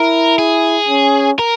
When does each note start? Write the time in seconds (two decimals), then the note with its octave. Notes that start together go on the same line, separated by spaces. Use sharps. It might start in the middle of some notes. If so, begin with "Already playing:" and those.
Already playing: E4 A#4
0.38 G#4
0.89 C#4
1.39 A#4